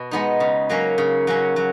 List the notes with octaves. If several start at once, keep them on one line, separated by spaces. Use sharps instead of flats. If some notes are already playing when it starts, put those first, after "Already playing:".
Already playing: B2
G#3 B3 D#4
C#3
F#3 A#3 C#4
C#3
F#3 A#3 C#4
F#3